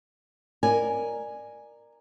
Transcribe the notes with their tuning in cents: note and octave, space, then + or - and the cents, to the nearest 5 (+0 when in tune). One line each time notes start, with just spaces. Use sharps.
A#4 +0 D5 +25 G#5 +0